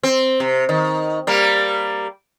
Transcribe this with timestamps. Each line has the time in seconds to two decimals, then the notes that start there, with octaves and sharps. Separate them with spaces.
0.03 C4
0.40 C3
0.69 D#3
1.27 G3 A#3